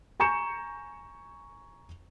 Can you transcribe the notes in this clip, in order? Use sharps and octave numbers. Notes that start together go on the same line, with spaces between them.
G#5 A#5 C#6 G6 C#7 E7